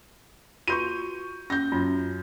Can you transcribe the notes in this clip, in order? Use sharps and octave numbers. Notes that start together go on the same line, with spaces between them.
F4 F#4 B4 C#6 G6 D#7
C#4 G6 A#6
F#2 F4